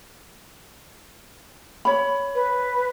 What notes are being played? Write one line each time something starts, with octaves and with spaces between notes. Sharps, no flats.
C#5 B5
B4